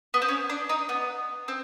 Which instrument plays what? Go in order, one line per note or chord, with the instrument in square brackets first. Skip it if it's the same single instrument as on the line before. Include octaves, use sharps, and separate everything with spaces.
[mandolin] B3
C4
C#4
D4
D#4
B3
C4